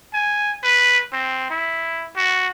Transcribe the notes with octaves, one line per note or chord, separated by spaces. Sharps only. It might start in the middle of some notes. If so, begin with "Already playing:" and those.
G#5
B4
C4
E4
F#4